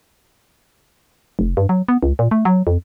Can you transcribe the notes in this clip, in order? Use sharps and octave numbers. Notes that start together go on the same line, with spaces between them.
F1
G2
F#3
B3
C#2
A#2
A3
F#3
F2